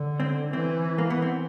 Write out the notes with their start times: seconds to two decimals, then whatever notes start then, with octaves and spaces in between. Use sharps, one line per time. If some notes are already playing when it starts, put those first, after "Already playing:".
Already playing: D3
0.20 C4
0.53 E3 C4
0.98 A#3
1.10 B3
1.22 C4